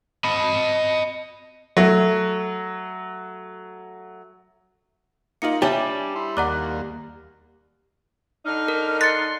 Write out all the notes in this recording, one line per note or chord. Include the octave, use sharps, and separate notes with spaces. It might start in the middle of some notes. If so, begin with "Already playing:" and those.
D#5 B5
F#3 A3
A#3 D#4 F4 C#7 F#7
G3 D4 G4 C#5 E5 G#5 A5
E4 C6
D#2 A#3 D5 F#5 A#5 D6 F#6
D3 D4 D#4 F6
A#4
C6 F#6 A6 C#7